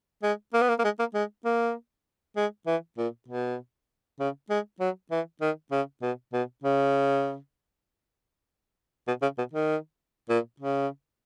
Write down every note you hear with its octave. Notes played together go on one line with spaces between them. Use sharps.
G#3
A#3
B3
A#3
A#3
G#3
A#3
G#3
A#3
G#3
E3
A#2
B2
C#3
G#3
F#3
E3
D#3
C#3
B2
B2
C#3
B2
C#3
B2
D#3
A#2
C#3